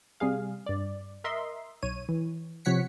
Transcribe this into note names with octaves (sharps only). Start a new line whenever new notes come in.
C3 G3 G#4 F5
G2 D5
A#4 D#5 E5 C6
B1 C#5 D#7
E3
C3 F3 C#5 F#5 B6 C#7